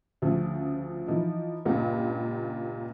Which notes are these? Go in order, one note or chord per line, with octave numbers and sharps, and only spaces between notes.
D2 C#3 F3
E3 F3 D#4
C#2 G2 A#2